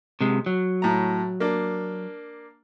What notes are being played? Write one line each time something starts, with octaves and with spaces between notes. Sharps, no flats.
C3 G#3
F#3
A2 A#5
A#3 D4